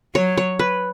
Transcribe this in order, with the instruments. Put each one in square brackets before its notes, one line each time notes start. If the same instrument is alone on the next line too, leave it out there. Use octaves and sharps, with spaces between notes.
[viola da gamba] F#3 [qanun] C#5
[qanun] C#5
B4